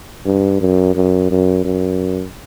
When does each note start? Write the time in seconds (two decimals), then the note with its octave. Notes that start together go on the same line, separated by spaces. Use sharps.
0.26 G2
0.61 F#2
0.95 F#2
1.31 F#2
1.65 F#2